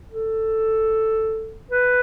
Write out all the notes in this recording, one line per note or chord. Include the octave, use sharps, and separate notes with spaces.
A4
B4